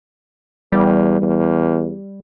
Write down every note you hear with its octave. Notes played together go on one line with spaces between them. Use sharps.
E2 G3
E2